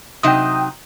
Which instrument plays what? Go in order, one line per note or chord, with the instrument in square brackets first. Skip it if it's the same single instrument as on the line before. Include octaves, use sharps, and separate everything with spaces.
[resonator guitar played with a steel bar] C3 F#3 D#4 [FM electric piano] G5 D#6